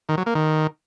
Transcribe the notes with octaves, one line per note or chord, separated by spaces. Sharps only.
D#3
F#3
A#3
D#3